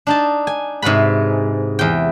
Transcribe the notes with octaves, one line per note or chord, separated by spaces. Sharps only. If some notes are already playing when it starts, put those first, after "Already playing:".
D4 D#4 A5
G#5
G#2 C3 F#4 B4 B5
E2 G5